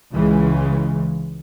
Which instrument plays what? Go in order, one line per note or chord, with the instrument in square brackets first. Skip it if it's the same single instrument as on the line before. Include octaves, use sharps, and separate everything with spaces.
[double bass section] C#2 C#3 E3 G#3